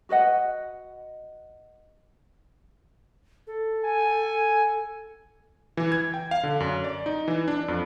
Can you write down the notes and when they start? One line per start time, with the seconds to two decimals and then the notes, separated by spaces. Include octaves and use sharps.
0.09 F#4 B4 D#5 F#5
3.47 A4
3.84 G#5
5.77 E3
5.92 G#6
6.14 G5
6.31 F5
6.43 D3
6.60 F#2
6.84 D5
7.06 D#4
7.28 E3
7.48 D4
7.68 F2